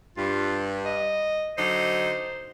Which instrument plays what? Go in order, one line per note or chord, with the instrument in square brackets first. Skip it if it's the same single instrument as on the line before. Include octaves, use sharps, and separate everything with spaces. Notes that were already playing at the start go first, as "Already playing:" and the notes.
[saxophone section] G2 [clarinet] F4
[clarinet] D#5
[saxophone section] D3 F#3 D#4 [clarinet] C5